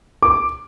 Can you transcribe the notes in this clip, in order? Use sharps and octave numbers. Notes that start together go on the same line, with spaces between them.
D6